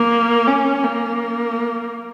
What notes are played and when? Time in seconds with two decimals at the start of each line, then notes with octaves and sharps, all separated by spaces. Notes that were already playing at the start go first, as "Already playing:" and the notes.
Already playing: A#3
0.47 C#4
0.84 A#3